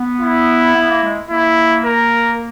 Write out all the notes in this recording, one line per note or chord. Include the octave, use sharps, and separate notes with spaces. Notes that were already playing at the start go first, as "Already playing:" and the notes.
Already playing: B3
E4
B3
A#3
G#3
A#3 E4
A#4